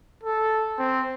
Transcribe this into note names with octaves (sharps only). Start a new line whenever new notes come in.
A4
C4